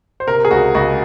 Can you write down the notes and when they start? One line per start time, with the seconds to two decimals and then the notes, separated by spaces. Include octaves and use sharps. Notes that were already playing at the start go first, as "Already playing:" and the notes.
0.20 C5
0.27 C3 A#4
0.45 G#4
0.51 C#2 F#4
0.75 C#2 F#4